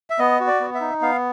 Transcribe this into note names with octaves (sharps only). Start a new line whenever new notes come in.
E5
B3 D#5
F#4
D5
B3
E5
D#4
B3 F5